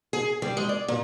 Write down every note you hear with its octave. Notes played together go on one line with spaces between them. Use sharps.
G#4
G3
G#3
D5
A#2